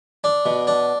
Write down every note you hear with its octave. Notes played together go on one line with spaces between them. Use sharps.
D4
B2
D4